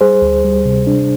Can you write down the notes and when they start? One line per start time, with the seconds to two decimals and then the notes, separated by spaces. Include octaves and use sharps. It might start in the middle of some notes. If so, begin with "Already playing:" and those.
0.01 G3 G#4 C5
0.22 D2
0.44 G3
0.66 C3
0.87 D4